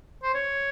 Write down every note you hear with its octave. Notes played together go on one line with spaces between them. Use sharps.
C5
C#5